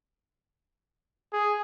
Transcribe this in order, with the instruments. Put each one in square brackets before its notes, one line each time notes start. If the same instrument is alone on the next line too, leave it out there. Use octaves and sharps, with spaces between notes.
[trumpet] G#4